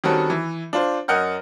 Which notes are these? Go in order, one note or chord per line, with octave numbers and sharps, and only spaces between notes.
D#3 G3 C4 C#4 F#4 A4
E3
D4 F4 C5
F#2 A#4 D#5 F#5 F6 G6